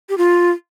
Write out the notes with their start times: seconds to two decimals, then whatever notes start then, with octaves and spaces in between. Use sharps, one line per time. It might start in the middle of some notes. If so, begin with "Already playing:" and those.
0.09 G4
0.18 F4